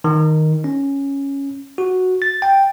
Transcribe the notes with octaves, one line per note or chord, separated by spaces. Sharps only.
D#3
C#4
F#4
A6
G5